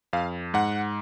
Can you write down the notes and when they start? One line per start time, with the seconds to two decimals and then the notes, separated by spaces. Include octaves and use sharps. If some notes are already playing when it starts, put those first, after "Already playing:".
0.13 F2 F5
0.54 G#2 F#5